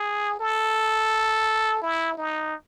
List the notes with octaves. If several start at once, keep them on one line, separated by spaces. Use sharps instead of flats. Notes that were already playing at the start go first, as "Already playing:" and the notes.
Already playing: G#4
A4
E4
D#4